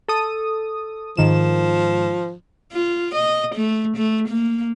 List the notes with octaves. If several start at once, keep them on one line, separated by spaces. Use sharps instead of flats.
A4 D#6
G#2 D#3 F3 E7
F4
D#5
A3
A3
A#3